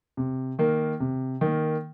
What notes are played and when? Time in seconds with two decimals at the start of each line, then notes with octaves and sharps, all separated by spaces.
0.17 C3
0.59 D#3 A#3
1.00 C3
1.41 D#3 A#3